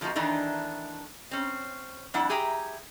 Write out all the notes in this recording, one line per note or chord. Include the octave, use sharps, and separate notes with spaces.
F2 F3 A3 A#3 D#4 F#4
D#3 E3 A3 D4 D#4
C4 C#4
F2 G3 D4 E4 F#5
G4 G#4 E5 G5 A#5